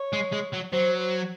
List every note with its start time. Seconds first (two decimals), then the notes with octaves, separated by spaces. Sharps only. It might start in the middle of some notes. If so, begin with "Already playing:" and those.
Already playing: C#5
0.13 G#3
0.32 G#3
0.53 F#3
0.73 F#3 C5
0.99 C5